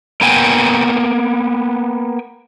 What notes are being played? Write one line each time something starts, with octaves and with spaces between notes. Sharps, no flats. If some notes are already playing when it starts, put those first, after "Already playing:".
A#3 B3 G5 G#5